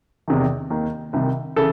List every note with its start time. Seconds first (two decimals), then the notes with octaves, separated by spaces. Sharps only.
0.28 E2 C3 D#3
0.70 D#2 D#3
1.13 C2 C3 D#3
1.56 C#3 E3 A4